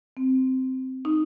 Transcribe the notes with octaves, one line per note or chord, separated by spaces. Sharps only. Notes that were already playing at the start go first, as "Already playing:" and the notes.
C4
D#4